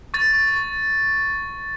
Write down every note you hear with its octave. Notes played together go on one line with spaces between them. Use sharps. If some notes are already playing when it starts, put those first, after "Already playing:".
C#6 A6